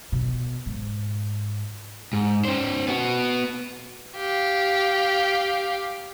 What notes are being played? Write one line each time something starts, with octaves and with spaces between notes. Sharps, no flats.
B2
G#2
G#2
C#4 C5
B3 F#4
G4 F5